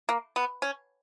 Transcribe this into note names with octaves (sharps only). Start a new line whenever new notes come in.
A#3
B3
C#4